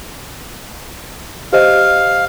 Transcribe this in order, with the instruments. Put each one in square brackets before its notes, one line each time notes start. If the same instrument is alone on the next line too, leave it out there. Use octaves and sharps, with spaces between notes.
[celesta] G4 C5 D#5 [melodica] F5